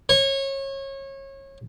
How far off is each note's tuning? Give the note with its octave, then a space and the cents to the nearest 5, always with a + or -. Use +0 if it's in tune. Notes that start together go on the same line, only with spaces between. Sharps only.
C#5 -25